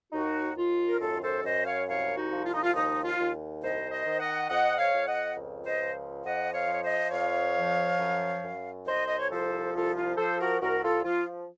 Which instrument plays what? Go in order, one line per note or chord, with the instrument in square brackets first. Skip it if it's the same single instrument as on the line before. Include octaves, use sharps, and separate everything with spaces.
[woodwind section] D#2 D#4 F#4
D#2 F4
A#4
F#2 F4 A4
A4 C5
F#2 C5 D#5
C#5 F5
C2 C#5 F5
D#4 F#4
F3
F4
D#4
F4
D#2 D#4
F4
D#2
C2 C5 D#5
C5 D#5
D#3
D#5 F#5
F2 D#5 F#5
C#5 F5
F2
D#5 F#5
C#2
C5 D#5
F3
F2 D#5 F#5
C#5 F5
F3 C#5
C5 D#5
F2 C#5 F5
F3
F#2
F#2
C2 C5 D#5
D#5
C#5
F3 A4 C5
C2 F4 A4
F4
F3 A4 C5
F#4 A#4
C2 F#4 A#4
F4 A4
F3 F4